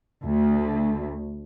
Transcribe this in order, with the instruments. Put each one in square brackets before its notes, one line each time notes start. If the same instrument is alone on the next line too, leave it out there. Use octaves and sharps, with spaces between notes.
[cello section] D2